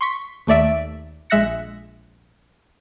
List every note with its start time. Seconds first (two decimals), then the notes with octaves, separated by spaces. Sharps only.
0.01 C6 C#6 B6
0.47 D#2 A3 D5 E5 D7
1.30 A#1 G#3 E5 F#6 A#6 C#7